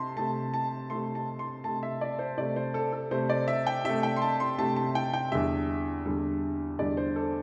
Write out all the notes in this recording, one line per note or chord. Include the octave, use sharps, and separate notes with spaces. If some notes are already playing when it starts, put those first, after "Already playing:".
Already playing: C3 A5 C6
C3 A3 A5
A5
C3 A3 C6
A5
C6
C3 A3 A5
E5
D5
C5
C3 A3 D5
C5
A4
A4
C3 A3 C5
D5
E5
G5
C3 A3 E5
G5
C6
A5
C6
C3 A3 A5
A5
G5
G5
E2 D3 G3 E5
E2 D3 G3
E2 D3 G3 D5
C5
A4